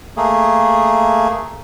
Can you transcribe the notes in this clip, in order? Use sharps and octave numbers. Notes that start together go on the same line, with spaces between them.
A3 A#3 G#4